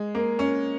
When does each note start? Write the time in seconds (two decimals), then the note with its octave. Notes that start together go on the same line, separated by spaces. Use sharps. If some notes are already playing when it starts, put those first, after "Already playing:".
Already playing: G#3
0.15 A#3
0.39 C#4